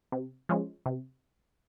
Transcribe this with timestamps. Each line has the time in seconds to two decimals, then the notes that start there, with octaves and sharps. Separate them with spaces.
0.12 C3
0.49 F3 G#3 C#4
0.86 C3